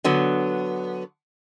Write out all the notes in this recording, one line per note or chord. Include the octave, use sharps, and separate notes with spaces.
D3 F#3 B3